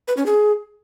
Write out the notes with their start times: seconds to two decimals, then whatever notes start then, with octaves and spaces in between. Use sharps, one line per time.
0.08 B4
0.17 C#4
0.26 G#4